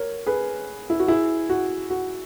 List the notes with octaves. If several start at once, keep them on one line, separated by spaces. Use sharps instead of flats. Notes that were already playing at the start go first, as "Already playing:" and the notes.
Already playing: A#4 C#5
G#4 B4
E4
F#4
E4 G#4
F#4
F#4